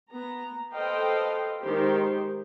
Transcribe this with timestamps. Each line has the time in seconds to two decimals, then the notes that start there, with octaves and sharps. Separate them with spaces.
0.13 B3 A#5
0.74 A4 B4 C5 D#5 F5 G5
1.62 D#3 G#3 G4 C5